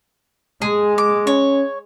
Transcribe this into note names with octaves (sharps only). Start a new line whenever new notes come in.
G#3 G#4
D6
C#4 C#5